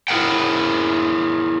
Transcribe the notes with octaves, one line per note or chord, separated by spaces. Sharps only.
E4 G#4 A#4 F#5 G5